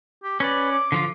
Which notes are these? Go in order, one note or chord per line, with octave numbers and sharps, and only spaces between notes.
G4
C#4 B4 D5
D6
D3 F3 F4